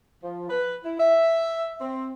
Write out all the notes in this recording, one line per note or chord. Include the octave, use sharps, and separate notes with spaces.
F3
B4
E4
E5
C4